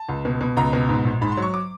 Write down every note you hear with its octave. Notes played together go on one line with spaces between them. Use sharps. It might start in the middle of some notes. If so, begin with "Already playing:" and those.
Already playing: A5
C#2
B2
B2
C#2 A#5
B2
G#2
A#1
G#2 B5
C6
F#3 C#6
D6